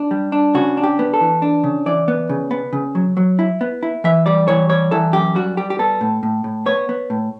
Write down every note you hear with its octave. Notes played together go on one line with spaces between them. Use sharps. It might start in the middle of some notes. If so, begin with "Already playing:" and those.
Already playing: D4
G3
D4
C#3 F#4
D4
G4
B3
A4
E3
D4
C#3
E3 D5
B3
C#3
B3
C#3
F#3
F#3
E4
B3
E4
E3 E5
G3 D5
E3 C#5
G3 C#5
E3 A4
F#2 G4
G3 F#4
G3 G4
G4
B3 A4
A2
A2
A2
B3 C#5
B3
A2